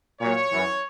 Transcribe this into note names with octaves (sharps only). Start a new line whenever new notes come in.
A#2 F#3 C#5
F#2 E3